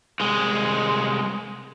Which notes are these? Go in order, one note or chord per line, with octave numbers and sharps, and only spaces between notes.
C2 G#3